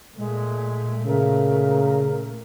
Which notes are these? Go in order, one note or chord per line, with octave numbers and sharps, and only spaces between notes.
A#2 G#3 A3
C#3 A#4